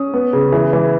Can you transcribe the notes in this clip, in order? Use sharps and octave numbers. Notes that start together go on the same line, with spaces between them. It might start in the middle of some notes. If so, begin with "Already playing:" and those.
Already playing: C#4 D#6
B3
C#3
E3
E3